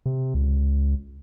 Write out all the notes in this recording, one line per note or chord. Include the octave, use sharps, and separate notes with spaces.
C3
C#2